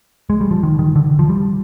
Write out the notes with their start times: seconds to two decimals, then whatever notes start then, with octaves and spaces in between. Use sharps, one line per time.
0.30 G#3
0.41 G3
0.51 F3
0.63 D#3
0.79 D#3
0.96 D3
1.19 F3
1.30 G3